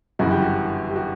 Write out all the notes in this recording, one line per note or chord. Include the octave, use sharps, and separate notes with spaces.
G1 F#2 C#3 E3 F#4
G4
F#4
G4
F#4